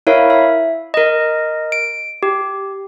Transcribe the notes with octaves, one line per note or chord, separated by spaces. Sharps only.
E4 A#4 C#5 E5 F5
E5
A#4 D#5
D7
G4